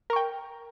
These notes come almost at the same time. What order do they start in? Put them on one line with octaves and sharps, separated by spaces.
A#4 C#6 G5